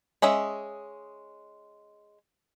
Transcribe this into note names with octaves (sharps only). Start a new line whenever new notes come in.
G#3 C#4 D#5 E5